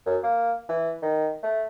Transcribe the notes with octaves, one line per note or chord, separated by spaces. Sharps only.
F#2
A#3
E3
D#3
A3